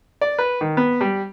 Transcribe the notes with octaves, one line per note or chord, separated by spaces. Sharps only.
D5
B4
D#3
B3
G3